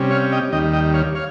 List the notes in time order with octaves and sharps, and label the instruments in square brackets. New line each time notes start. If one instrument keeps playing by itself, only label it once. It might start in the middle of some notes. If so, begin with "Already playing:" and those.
Already playing: [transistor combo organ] C3 G3 C#4
C#5 F5
D#5 G5
D#2 D#3 G3 D#5 G5
D#5 G5
C#5 F5
C#5 F5